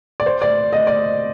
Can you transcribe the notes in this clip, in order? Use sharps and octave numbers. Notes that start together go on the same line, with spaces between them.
D5
C5
D5
D#5
D5